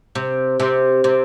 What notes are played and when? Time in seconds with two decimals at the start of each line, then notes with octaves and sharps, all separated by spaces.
0.15 C3
0.60 C3
1.04 C3